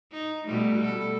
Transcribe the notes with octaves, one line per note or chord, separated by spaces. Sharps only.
D#4
B2 G3 A3
A4